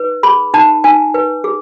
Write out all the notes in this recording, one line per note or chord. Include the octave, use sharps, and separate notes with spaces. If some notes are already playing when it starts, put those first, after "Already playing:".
Already playing: D#4 B4
G#4 B5
D#4 A5
D#4 G#5
B4
G#4